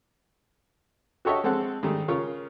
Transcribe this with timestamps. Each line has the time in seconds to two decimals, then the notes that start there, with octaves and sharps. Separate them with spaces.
1.25 F#4 G4 A4 C#5 D#5 E5
1.44 G#3 C4 A4 F#5
1.83 G#2 D#3 G3 A3
2.08 C#3 F4 A#4 C#5